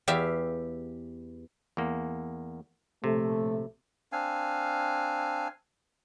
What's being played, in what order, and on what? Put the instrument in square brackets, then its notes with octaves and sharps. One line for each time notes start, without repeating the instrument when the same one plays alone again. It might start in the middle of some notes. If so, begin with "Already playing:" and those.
[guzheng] E2 G4 E5 F5
[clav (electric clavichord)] E2 A#3
[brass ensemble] A#1 A2 A3 [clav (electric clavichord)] C3
[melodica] C4 D4 F5 G#5